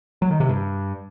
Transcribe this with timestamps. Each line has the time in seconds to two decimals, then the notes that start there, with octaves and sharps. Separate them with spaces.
0.22 F#3
0.31 D#3
0.40 C3
0.49 G2